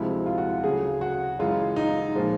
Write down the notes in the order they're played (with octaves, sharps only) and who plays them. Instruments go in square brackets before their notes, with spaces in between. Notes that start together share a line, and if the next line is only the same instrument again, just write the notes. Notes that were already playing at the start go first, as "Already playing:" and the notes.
Already playing: [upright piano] D2 C3 F3 G#3 E4
F4
F#4
F4
D2 C#3 F#3 A3 G#4
F#4
F#2 C#3 E3 G#3 F4
D#4
A#2 F3 G#3